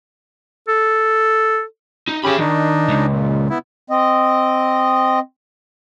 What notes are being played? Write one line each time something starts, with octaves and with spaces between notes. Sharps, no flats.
A4
D#4
C#4 G4 G#4 B5
D#3 D4 D#4
C#2
A#2
B3 E4
C4 D#5